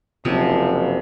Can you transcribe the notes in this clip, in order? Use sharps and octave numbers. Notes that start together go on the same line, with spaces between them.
F#1 C3 F3